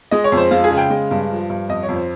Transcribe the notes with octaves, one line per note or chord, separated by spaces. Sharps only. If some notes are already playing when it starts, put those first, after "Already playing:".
G#3 D#5
C#5
F2
C5
G#3 F4
G#4
C#3
G5
G#3
G2
F3
G2
F2 D#5
C#5
F2
C5